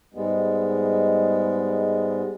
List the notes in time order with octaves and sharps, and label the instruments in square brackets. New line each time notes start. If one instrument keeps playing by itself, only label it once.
[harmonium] G#2 G3 G#3 B3